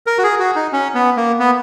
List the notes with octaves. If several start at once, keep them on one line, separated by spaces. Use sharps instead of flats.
A#4
F#4
G#4
F#4
D#4
C#4
B3
A#3
B3